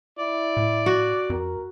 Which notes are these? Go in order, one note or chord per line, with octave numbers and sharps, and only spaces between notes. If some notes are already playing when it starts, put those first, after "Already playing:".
E4 D5
A2
F#4
F2 A#4